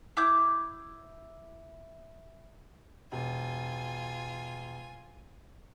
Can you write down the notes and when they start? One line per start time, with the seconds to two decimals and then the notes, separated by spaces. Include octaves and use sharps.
0.17 E4 D6 G6
3.12 E1 F4 G#5